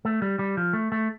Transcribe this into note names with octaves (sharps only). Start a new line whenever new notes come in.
A3
G3
G3
F3
A3
A3